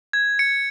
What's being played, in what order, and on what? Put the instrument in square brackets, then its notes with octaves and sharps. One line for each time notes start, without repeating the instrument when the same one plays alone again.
[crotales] G#6
C#7